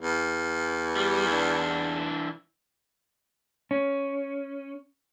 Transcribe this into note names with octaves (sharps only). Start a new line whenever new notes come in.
E2
G3
E3 D4
C#4